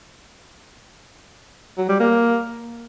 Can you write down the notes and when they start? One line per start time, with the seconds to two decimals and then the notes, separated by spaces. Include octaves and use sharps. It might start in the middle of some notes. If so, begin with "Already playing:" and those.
1.78 F#3
1.89 G3
2.00 A#3